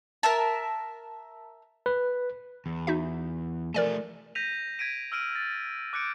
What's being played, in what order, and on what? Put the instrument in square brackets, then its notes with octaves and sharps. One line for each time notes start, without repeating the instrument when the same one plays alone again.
[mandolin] A#4 E5 A5
[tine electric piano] B4
[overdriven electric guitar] E2
[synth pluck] D#4 F#4 E5
[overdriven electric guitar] F3 A3 [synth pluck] A#4 D5 G#5
[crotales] G6 A#6 B6 D#7 F7
G#6 B6 D7 D#7
E6 F6 D7 D#7
A6
D6 F#6 G6 C#7 D7